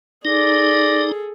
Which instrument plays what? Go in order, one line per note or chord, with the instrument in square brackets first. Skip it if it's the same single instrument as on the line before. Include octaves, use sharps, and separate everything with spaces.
[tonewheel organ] D#4 [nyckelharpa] G#4 A4 [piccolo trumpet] D5 [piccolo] A#6